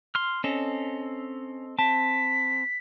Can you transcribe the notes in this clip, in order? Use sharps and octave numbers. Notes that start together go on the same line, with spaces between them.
C6 F6
C4 C#4 A4 D#5
C4 A5 B6